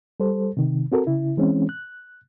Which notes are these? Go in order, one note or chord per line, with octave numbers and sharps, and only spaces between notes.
G3 A4 C5
C3 D#3
C4 F#4 A4 A#4
C#3 E4
E3 G#3 C4 C#4
F#6